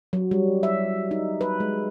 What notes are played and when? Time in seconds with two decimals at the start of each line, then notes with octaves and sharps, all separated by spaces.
0.13 F#3
0.31 G3
0.63 E5
1.11 D#4
1.41 B4
1.60 G#3